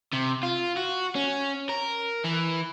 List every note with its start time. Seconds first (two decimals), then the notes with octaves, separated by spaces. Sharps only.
0.13 C3
0.43 F4
0.76 F#4
1.15 C#4
1.69 A#4
2.24 E3